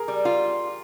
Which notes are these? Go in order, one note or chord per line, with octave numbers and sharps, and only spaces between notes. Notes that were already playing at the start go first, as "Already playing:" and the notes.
Already playing: G#4 A#4
G3
F4